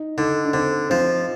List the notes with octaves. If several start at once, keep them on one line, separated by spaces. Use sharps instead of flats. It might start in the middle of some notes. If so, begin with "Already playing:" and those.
Already playing: D#4
D3 D#4
D4
D3 C4
F3 C4